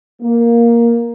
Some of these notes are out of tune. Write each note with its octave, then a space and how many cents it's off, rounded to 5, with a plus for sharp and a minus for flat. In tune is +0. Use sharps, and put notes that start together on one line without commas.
A#3 +5